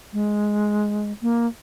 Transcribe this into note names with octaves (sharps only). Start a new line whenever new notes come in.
G#3
A#3